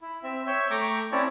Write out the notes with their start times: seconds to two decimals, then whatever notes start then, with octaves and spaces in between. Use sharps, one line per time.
0.01 E4
0.23 C4 E5
0.47 C#5 E5 G5
0.71 A3 G5 A#5 C#6 D6
1.12 C4 C#4 E4 C#5 D5 A5